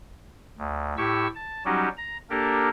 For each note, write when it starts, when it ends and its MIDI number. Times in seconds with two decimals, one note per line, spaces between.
0.58 0.95 38
0.97 1.27 45
0.97 1.27 64
0.97 1.27 67
0.97 1.27 85
0.97 1.27 88
1.35 1.63 81
1.65 1.89 54
1.65 1.89 55
1.65 1.89 61
1.65 1.89 63
1.65 1.89 66
1.65 1.89 67
1.97 2.17 82
2.30 2.69 58
2.30 2.69 62
2.30 2.69 67
2.30 2.69 69
2.30 2.69 70